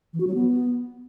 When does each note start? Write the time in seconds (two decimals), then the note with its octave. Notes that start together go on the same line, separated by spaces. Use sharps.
0.13 E3
0.20 F#4
0.27 F#3
0.34 B3